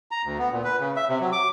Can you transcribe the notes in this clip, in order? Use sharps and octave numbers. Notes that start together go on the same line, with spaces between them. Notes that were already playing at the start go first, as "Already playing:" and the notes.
A#5
D2
B3
A#2
B4
C#3
E5
C3
F#3
D6